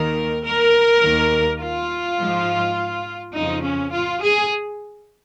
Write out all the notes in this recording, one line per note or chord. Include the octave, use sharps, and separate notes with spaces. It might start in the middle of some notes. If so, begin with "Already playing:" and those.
Already playing: D#2 D#3 A#4
A#4
D#2 D#3
F4
G#2 F3
F2 C#3 F3 D#4
C#4
F4
G#4